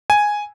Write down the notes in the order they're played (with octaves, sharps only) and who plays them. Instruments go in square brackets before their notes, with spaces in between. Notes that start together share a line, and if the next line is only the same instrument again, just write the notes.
[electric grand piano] G#5